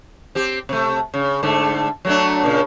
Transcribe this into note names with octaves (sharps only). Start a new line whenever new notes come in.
C4 G4
C3 A3
C#3
G#2 D3 A3
F#3 A3 D4
A#2 C#3